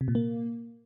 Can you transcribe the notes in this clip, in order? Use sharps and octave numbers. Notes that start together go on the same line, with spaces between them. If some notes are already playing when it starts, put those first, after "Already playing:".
C3
A#2
A#3